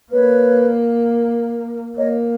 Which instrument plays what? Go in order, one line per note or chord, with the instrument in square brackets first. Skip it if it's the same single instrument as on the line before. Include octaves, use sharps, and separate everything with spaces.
[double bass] A#3 [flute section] B4 C#5
[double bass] A#3 [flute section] C#5 D#5